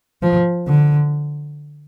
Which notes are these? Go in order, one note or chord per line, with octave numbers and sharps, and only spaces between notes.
F3
D3